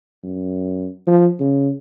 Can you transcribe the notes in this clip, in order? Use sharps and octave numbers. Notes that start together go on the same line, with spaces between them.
F#2
F3
C#3